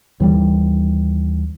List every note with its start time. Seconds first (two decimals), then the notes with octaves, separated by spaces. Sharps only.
0.20 D#2 E3 F3 G3